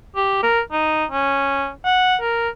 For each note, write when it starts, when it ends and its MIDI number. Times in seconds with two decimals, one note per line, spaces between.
0.16 0.40 67
0.43 0.60 70
0.72 1.05 63
1.12 1.69 61
1.85 2.16 78
2.21 2.49 70